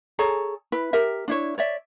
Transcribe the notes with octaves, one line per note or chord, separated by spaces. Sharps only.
G#4 A4 C#5 A#5
E4 B4
G4 A#4 E5
D4 E4 C#5
C#5 D5 E5